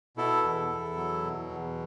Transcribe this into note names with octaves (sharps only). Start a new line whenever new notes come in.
B2 E4 A4
E2
E2
F#3
B2
E2